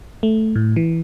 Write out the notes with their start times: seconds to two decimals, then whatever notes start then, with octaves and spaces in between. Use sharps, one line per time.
0.23 A3
0.56 A2
0.76 E3